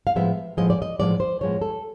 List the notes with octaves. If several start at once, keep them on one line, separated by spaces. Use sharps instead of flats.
F5
A2 F3 G#3 B3 E5
A2 F3 G#3 B3 D#5
D5
D#5
A2 F3 G#3 B3 D5
C5
A2 F3 G#3 B3 C#5
A4